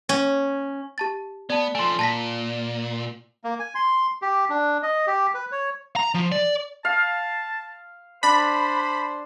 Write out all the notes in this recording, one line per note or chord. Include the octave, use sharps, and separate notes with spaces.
C#4
G4 A5 A6
B3 D5 A5
F3 A3 G#5 C6
A#2 A5 A#6 B6
A#3
G#5
C6
G4
D4
D#5
G4
B4
C#5
A#5
F3
D5
F5 A5
D4 C5 B5